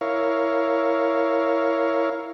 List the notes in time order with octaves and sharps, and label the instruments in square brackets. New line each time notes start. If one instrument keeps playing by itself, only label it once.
[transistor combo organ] E4 A#4 C#5 F5